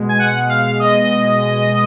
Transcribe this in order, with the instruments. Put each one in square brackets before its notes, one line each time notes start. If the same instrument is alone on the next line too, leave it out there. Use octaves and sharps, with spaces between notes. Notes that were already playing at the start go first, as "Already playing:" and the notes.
Already playing: [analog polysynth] B2 G#3
G#5
F#5
F5
D#5